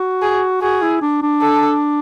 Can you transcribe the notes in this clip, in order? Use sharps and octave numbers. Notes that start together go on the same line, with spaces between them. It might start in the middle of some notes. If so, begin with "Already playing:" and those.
Already playing: F#4
G#4
F#4 G#4
E4
D4
D4
A4